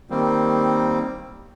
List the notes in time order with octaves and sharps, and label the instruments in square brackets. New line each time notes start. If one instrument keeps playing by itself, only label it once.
[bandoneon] D#3 G3 A#3 C4